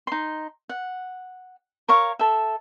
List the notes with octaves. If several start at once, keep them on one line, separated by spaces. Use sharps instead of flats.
D#4 C6
F#5
A#4 C#5 F5 C#6
A4 E5